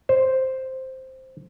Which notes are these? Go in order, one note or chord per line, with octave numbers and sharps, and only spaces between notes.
C5